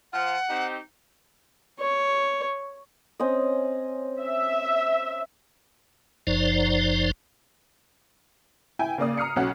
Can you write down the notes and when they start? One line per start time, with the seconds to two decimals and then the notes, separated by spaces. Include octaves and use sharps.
0.13 F3 F4 C5 F#5
0.49 C4 D#4 G4
1.79 C#5
3.19 C4 C#4 D#5
4.21 E5
6.27 F#1 F#2 F3 D#4 C5 D5
8.79 E4 G5 G#5
8.98 C#3 A#3 D5 D#6
9.17 A#5 D#6 F6 C7 C#7
9.36 B1 F#3 C#4 F#5